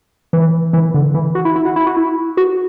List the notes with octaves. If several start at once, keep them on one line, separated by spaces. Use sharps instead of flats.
E3
E3
D3
E3
F#4
E4
E4
F#4
E4
F#4
E4
F#4